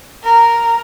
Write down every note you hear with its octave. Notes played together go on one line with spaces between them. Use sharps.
A#4